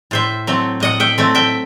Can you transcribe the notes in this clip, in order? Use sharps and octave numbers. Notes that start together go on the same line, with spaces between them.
A2 C5 E5
F#3 A3 C4
A2 D#5 F#5
E5 G5
F#3 A3 C4
E5 G5